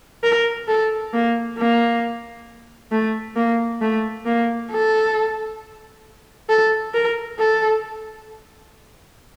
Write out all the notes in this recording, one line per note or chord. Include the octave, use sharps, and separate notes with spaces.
A#4
A4
A#3
A#3
A3
A#3
A3
A#3
A4
A4
A#4
A4